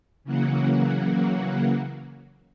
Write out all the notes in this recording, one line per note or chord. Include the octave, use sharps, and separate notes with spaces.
C#3 E3 F#3 A#3 F#4